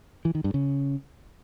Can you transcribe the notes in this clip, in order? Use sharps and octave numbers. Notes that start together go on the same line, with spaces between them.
E3
D#3
G2
C#3